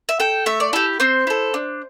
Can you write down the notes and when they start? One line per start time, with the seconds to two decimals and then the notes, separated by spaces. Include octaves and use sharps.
0.09 E5
0.20 A4 G5
0.46 A3 E5
0.60 D5
0.73 E4 G4 A4
1.00 C4 C5
1.27 E4 A4
1.54 D4